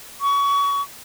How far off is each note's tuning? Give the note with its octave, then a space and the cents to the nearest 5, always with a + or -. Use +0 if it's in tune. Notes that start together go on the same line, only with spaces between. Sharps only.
C#6 +25